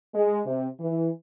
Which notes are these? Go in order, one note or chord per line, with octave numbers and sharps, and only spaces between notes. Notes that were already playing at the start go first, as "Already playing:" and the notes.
G#3
C3
E3